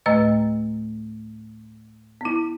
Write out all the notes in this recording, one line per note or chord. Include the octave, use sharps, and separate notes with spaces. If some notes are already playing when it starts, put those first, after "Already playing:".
D2 A2 A3 B4 D#5 E6
B3 E4